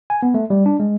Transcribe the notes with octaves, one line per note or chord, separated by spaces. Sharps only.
G#5
B3
A3
G3
D4
G#3